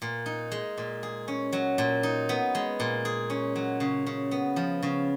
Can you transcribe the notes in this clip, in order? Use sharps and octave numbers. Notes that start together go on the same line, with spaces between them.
A#2
D#4
G#3
A#2
G#4
C#4
F#3
A#2
D#4
B3
G#3
A#2
G#4
C#4
F#3
C#3
C#3
B3
F3
C#3